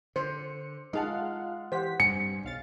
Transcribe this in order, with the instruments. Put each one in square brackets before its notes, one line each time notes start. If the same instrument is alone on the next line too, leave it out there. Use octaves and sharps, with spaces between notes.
[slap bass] D3 [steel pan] C5 [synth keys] C#7
[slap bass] G#3 [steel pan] D#4 G#4 A5 [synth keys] F4 F5 F#5
[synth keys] E3 G4 B6 [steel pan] C5 F#5
[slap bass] G2 G3 [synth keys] C3 [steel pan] G#5 [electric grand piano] C#7
[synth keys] B1 F5 A6